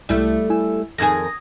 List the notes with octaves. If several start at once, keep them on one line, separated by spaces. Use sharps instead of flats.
C2 G3 A3 E4
E4 G#5 E6
F2 D#3 G#4 D#6 G#6 A#6